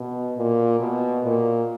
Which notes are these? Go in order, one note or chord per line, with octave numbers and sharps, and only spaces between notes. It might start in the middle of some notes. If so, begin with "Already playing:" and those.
Already playing: B2
A#2
B2
A#2